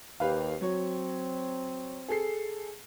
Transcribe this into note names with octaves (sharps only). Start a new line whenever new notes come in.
D#2 G4 B4 F5
F#3 C4 C#5
G#4 A4 C7